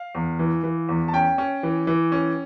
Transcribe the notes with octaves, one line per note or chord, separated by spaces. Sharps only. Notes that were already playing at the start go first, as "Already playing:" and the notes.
Already playing: F5
E2
E3
E3
E2
A5
C#4 G5
C#4
E3
E3
C#4